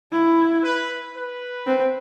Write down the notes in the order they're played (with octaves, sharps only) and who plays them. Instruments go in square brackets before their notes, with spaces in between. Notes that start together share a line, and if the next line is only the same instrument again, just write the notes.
[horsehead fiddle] E4
[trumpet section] B4
B4
[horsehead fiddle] C4